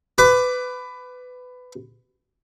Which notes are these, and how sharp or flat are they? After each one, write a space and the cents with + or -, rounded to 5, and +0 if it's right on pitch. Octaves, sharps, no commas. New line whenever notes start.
B4 +20 D6 +0